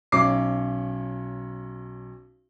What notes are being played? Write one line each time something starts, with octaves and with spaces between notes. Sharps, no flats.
B1 C#4 D6 C7